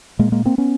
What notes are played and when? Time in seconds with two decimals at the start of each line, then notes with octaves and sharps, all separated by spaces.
0.19 A#2 G#3 A#3
0.32 G#3 A#3
0.45 A#3 C4
0.58 B3 C#4